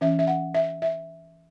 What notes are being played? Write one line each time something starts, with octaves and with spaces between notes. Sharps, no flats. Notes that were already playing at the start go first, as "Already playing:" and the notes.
E3 C#4 E5
E5
F#5
E5
E5